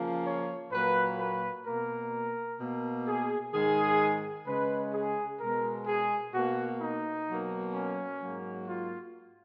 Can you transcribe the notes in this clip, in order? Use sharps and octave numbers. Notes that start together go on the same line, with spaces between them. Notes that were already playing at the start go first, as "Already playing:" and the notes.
Already playing: C#3 F3 A#3
C#5
A#2 F#3 A#3 B4
B4
B2 A#3 A#4
B2 A#3
G#4
G#2 D#3 G#3 G#4
C#3 G#3 B4
G#4
B2 G#3 A#4
G#4
B2 A#3 F#4
D#4
B2 F#3 A#3
C#4
G#2 F#3 A#3
F4